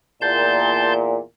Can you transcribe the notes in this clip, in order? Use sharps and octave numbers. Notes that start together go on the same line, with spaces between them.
E2 A#2 A5 C6 G6